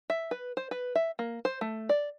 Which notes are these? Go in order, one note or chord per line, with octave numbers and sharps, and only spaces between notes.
E5
B4
C5
B4
E5
A#3
C5
A3
D5